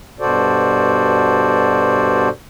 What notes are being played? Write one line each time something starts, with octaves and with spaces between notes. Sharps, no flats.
G2 B2 F#4 A4 C5 D5